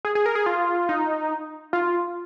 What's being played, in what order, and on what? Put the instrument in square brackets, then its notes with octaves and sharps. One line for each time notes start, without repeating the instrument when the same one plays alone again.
[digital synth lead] G#4
G#4
A#4
G#4
F4
D#4
F4